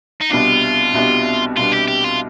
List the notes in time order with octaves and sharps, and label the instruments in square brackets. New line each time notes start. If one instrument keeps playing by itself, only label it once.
[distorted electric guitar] D#4
[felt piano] C2 B2 G3 B3 D4 [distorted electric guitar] F4
[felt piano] C2 B2 G3 B3 D4
[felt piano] C2 B2 G3 B3 D4 [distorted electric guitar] F4
[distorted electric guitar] G4
G4
F4